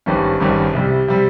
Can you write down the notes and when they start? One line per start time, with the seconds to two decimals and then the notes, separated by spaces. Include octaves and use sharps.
0.06 G#1 G2 D#3 G3 C#4
0.40 G#1 G2 D#3 G3 C#4
0.73 C2 C3 G3
1.08 C3 G3